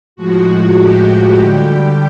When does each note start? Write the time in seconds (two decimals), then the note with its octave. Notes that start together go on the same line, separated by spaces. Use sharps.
0.16 A2 F3 G#3 F#4
0.47 F#4
0.77 G4
1.38 D3 G3